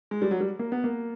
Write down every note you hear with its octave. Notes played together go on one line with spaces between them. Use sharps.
G#3
G3
F#3
G3
A#3
B3
A#3